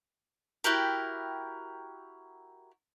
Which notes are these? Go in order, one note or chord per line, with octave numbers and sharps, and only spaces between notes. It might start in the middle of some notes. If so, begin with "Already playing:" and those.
E4 F#4 G4 A#4